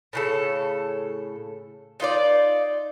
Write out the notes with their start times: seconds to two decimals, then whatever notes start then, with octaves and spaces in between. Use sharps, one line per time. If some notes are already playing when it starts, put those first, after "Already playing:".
0.13 A2 C#3 A4
2.00 D#4 F4 B4 D5